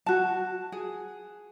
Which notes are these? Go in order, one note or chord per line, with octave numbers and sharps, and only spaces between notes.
F#4 A5
G#4